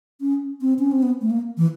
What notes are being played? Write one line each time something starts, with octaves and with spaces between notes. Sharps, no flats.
C#4
C4
C#4
C4
B3
A3
A#3
E3